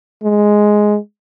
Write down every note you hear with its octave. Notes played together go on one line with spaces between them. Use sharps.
G#3